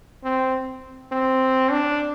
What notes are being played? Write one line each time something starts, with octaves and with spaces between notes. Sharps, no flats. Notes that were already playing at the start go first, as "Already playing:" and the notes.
C4
C4
D4